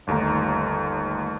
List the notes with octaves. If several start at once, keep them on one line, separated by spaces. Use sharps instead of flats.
G1 D#2 A3 A#5